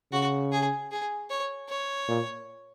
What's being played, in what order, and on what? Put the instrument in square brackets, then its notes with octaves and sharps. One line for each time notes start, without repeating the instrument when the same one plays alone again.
[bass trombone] C#3 [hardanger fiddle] F#4
[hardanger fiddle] G#4
G#4
C#5
C#5
[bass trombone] A#2